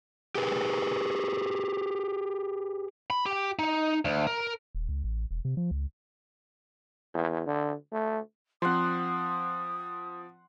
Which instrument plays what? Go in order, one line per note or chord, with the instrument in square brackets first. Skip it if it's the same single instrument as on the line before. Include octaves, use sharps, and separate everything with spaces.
[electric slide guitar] G4 G#4 B4
[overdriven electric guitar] B5
G4
D#4
D2
A#4
[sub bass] D#1
C#2
A1
E1
C3
F3
C#2
[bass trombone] E2
D3
A3
[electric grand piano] F3 C4 [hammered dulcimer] F#5 C6 [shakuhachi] D#6